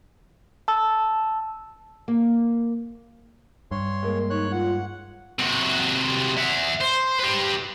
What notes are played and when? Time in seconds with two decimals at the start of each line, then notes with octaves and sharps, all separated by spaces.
0.68 A5 E6
2.08 A#3
3.71 G2 C#5 C6
4.03 G#3 A#3
4.30 D#4 C#5 F#6
4.52 F4 F#5
5.39 C3 F#4
6.37 E5 F#5
6.81 C5
7.20 G4 B4